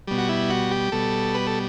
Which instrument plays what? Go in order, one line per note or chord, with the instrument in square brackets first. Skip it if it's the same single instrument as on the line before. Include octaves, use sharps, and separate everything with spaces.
[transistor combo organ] B2 G3
F#4
E4
F#4
G4
B2 G3 A4
B4
A4